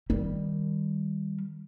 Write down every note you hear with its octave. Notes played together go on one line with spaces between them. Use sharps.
D#3 G3